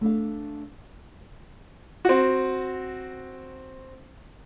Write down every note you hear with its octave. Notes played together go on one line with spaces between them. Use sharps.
A3 D4 F5
C4 F#4